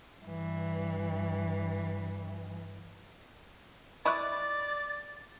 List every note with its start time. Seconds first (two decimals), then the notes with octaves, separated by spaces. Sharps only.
0.25 G2 E3
4.05 E4 D5 D#5 B5 C#6 F#6 A6